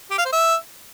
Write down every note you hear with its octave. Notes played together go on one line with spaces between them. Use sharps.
G4
F5
C5
E5